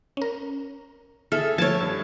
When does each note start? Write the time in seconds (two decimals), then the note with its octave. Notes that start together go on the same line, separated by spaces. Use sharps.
0.17 C#4 A#4
1.32 G#4 A4 E5 F6
1.58 F3 A3 A4 C#5 A5 G#6
1.81 G2